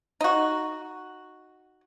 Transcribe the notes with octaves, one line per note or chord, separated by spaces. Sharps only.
D#4 F#4